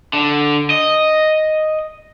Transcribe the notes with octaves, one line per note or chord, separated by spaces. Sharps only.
D3
D#5